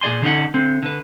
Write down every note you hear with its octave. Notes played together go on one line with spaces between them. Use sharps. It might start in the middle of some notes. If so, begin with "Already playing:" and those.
A#2 G#4 D5 G#5 C6
D3 C4 C#4 D#4 F#5
D3 C4
D3 B4